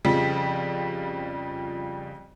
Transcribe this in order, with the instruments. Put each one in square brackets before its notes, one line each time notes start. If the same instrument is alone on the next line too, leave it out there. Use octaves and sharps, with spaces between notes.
[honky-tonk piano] F2 C#3 F3 G3 B6